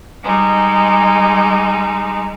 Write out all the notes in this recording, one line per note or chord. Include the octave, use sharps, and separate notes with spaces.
G3 G#3 D#4